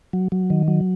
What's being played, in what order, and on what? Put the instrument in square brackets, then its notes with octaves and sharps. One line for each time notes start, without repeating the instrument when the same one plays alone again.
[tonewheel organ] F#3
F#3
D#3
F#3